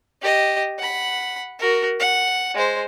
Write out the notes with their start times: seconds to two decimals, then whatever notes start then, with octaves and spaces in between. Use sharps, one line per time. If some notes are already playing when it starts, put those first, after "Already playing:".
0.22 G4 D#5
0.79 F#5 B5
1.59 F#4 A#4
2.00 F#5
2.55 G#3 C5